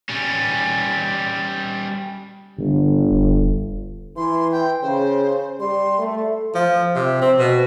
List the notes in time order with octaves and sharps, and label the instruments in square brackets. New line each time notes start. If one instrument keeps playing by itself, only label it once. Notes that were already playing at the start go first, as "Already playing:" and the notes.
[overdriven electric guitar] G3 C#4
[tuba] G1 [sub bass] D3
[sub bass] E1
[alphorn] E3 [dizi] C6
[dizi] G5
[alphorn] C#3 [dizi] C5
[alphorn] G3 [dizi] C6
[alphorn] A3
[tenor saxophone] F3
C3
C4
B2